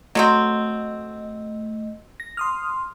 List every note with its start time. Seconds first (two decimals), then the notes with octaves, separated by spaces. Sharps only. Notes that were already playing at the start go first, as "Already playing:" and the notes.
0.15 F#3 G#3 A3 C4 D#5
2.20 A#6
2.37 C6 D#6 F6